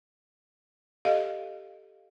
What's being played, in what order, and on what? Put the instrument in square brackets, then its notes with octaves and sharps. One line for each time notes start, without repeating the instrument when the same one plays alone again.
[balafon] G4 A4 D#5 F5